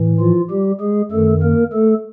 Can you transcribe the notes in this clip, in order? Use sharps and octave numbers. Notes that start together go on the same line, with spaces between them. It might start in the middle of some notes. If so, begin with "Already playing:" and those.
Already playing: A2 E3
F3 F4
G3 G4
G#3 G#4
F#2 D#3 A3 A4
A#3 A#4
A3 A4